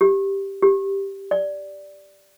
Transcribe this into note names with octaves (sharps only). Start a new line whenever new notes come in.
G4
G4
D5